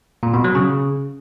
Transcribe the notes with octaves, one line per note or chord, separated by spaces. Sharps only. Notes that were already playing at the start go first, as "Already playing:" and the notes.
A#2
B2
F#3
C#3